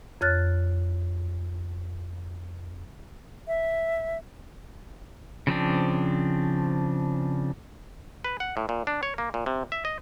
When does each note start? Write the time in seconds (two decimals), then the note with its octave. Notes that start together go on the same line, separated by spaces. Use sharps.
0.21 F2 C#5 F6 F#6 A6
3.47 E5
5.47 C#3 F3 C4 D4
8.24 B4
8.40 F#5
8.57 A2
8.69 A#2
8.87 D4
9.03 C#5
9.18 A#3
9.34 A#2
9.46 C3
9.72 E5
9.85 D#5